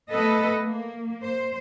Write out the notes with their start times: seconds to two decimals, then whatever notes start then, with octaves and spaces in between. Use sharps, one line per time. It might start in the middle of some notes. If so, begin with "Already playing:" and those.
0.11 A3 B3 A4 B4 D#5
0.68 A#3
1.22 C5